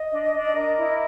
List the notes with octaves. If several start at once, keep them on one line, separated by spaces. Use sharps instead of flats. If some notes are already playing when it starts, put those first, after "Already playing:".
Already playing: D#5
D4
D4
A#4
E4